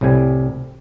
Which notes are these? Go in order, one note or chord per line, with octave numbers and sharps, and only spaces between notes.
C2 A2 C3 G3 G#5